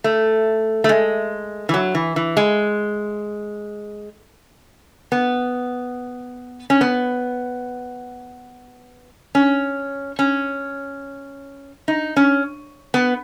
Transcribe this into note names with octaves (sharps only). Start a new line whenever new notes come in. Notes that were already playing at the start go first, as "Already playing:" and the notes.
A3
A3
G#3
E3
F#3
E3
E3
G#3
B3
C#4
B3
C#4
C#4
D#4
C#4
B3